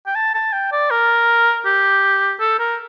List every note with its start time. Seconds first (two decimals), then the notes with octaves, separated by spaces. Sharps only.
0.06 G5
0.15 A5
0.34 A5
0.53 G5
0.72 D5
0.90 A#4
1.65 G4
2.40 A4
2.59 A#4